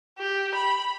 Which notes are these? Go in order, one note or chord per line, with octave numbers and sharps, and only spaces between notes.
G4
B5